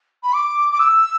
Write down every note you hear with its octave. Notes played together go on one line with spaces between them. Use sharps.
B5
D6
D6
E6